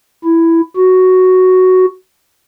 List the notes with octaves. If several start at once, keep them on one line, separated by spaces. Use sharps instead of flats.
E4
F#4